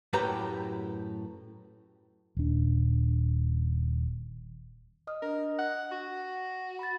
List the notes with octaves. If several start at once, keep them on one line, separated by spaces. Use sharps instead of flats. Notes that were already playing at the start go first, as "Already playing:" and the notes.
F#2 A2 G4 B4 G5 A#5
D#1 D4
D#5 D#6 F6
D4 A#4 D#5
F#5 F#6
F#4 C#6
B5 A6